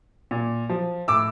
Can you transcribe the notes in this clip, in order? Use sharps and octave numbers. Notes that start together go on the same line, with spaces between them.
A#2
F3
A2 D6 E6